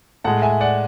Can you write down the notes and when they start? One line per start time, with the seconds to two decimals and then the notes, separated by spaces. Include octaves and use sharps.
0.24 A2 G#3 F#5 A5
0.42 E5 G#5
0.61 D5 F#5